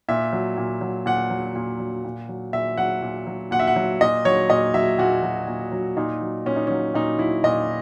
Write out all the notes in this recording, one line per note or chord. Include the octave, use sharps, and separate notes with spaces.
A#2 E5
F#3
A#2
F#3
A#2 F#5
F#3
A#2
F#3
A#2
F#3
A#2 E5
F#3 F#5
A#2
F#3
A#2 F#5
E5
F#5
F#3
A#2 D#5
F#3 C#5
A#2 D#5
F#3 E5
A#2 F#4
F#3
A#2
F#3
A#2 D#4
F#3
A#2 C#4
D#4
F#3 C#4
A#2 D#4
F#3 E4
A#2 D#5